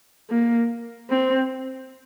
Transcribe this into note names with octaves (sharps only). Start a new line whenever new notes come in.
A#3
C4